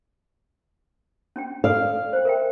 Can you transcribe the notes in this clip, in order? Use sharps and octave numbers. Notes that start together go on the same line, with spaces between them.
C#4 D4 G5
A4 D5 F5 E6
C5 G5
A#4 E5 G5